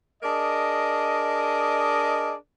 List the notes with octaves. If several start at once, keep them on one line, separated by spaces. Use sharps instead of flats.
D4 G#4 A#4 D5 D#5